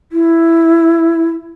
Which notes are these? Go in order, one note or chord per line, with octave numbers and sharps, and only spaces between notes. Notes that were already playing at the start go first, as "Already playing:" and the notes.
E4